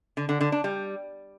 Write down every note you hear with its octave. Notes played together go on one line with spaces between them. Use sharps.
D3
D3
D3
D4
G3